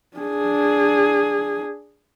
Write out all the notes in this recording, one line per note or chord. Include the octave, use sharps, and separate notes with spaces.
D4 G#4